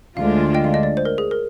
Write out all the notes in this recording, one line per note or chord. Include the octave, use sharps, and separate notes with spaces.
D2 D3 G#3 D4 F4 F5
D#5 G5
F5
D#5
D5
C5
A#4
G#4
A#4